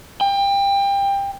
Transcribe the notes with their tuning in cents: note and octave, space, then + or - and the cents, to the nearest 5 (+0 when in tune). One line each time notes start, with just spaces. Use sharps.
G5 +25